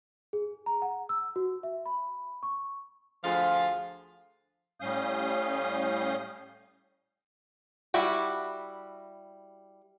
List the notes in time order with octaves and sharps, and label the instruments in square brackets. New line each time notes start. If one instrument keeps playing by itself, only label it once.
[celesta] G#4
A#5
F#5
E6
F#4
E5
B5
C#6
[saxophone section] D2 F3 F4 G#4 F5
[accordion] A2 G3 C#4 F5 D#6 G6
[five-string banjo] G3 E4 F#4 G4